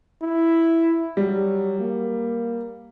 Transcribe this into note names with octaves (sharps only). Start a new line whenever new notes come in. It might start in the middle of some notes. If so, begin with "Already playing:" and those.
E4
F#3 G3
A#3